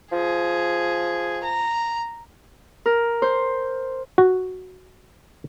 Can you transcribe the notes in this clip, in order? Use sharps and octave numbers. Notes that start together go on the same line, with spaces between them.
F3 G#4
A#5
A#4
C5
F#4